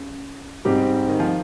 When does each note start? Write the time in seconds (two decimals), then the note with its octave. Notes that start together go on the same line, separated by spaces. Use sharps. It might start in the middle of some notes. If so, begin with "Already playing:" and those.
Already playing: C#3
0.65 G#2 C3 G3 C4 D#4 G4
1.09 D#3
1.20 F3